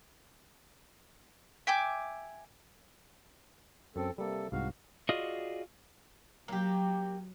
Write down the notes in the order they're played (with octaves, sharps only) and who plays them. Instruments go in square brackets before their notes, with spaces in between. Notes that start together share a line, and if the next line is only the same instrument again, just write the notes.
[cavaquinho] E5 G5 G#5 D6
[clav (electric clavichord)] F#2 [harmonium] C4 A4
[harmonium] C3 A4 [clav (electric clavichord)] G3 A#3
[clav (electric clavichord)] C2 G#2 [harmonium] F#4 F5
[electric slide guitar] F4 F#4 G#4 D5 D#5
[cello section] F#3 [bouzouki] A#3 G4